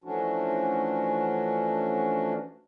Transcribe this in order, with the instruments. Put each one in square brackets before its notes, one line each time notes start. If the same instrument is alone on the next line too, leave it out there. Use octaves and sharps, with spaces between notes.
[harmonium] E3 F3 A3 C#4 D4 F#4